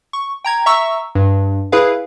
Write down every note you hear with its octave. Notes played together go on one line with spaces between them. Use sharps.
C#6
G5 A#5 G#6
E5 A#5 C#6 E6
G2
E4 G#4 B4 F5